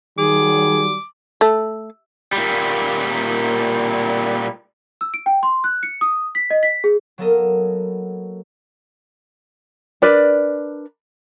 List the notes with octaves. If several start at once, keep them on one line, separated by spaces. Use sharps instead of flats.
D#3 F#3 G3 G#4 D6
A3
A#2 G3
E6
D7
G5
C6
F#6
C#7
D#6
B6
D#5
B6
G#4
F#3 A#3 B3 A4 A#4 D#5
D4 A#4 B4 D5